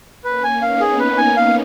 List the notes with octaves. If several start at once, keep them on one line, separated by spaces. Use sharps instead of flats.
A#3 C#4 B4
G#5
B3 D#4 F5
G#4
B4
G#5
F5